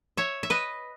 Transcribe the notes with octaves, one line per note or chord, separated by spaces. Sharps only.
C#5 E5
E5
B4 D#5